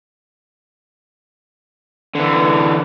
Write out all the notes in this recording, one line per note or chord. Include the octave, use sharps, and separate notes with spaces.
D3 E3